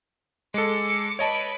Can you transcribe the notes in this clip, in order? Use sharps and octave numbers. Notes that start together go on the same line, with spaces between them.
G#3 A4 D6 C#7
B4 C#5 D#5 A5 D7